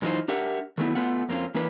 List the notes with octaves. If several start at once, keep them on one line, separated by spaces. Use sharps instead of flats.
F#2 E3 F#3 D#4 F4 C5
D4 G4 A#4 E5 F#5
D#3 F#3 A3 B3 E4
A3 B3 F4 F#5
F2 A#3 C4 C#4 F4
E3 A#3 D4 B4